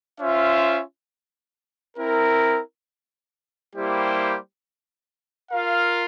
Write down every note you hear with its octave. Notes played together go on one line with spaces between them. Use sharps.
C#4 F4 C5 E5
C4 E4 A#4
G3 A#3 E4 G4 C5
F4 A#4 F5